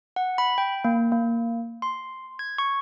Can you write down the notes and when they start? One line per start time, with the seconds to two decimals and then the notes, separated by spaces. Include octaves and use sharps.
0.16 F#5
0.38 B5
0.58 G5
0.85 A#3
1.12 A#3
1.82 C6
2.39 G#6
2.58 C#6